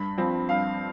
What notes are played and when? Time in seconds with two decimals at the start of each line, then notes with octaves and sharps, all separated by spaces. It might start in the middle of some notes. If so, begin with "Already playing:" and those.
Already playing: G2 B5
0.17 F3 C4
0.49 G2 F5